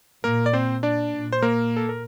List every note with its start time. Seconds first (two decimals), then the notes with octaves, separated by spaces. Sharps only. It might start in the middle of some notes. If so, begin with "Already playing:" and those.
0.24 A#2 A#3 A#4
0.46 D5
0.53 C4 C5
0.83 D4 D5
1.13 A#2
1.33 C5
1.42 A#3 A#4
1.77 A4
1.89 A#4